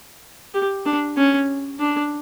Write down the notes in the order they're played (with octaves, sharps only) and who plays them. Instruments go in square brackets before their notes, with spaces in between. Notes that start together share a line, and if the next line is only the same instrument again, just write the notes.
[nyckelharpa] G4
D4
C#4
D4